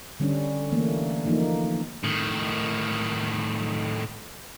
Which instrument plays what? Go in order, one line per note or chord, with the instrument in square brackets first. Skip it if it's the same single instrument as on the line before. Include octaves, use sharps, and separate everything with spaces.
[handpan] D3 G3 C#4 D4
E3 A3 A#3
E3 F3 A#3 D#4
[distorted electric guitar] A2 D#3